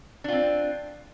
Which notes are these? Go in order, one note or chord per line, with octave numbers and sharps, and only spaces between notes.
C4 D4 F4